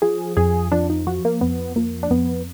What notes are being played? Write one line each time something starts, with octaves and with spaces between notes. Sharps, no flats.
F3 G#4
F2 G#4
F3 D4
D#4
F3 F#4
A#3
F2 B3
F3 A#3
D4
F2 B3